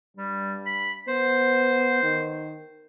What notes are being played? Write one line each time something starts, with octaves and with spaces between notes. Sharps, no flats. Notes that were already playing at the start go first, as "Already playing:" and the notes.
G2 G3
B5
B3 C5
D#3